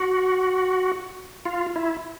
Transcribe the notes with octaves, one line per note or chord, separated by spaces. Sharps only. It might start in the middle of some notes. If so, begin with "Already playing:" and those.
Already playing: F#4
F4
E4